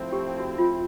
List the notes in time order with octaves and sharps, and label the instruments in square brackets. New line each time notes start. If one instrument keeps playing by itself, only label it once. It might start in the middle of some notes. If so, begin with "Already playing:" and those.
Already playing: [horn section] F3 A3 C4 E4
[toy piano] G4
F#4
F4